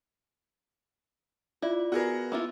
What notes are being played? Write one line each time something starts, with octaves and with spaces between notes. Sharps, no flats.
E4 F4 D5
B3 F#4 G#4 A#4 B4
A#3 E4 F4